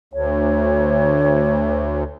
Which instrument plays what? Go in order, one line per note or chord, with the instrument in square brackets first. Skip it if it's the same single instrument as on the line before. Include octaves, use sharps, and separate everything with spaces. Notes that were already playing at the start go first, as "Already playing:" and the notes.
[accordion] D2 [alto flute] C#5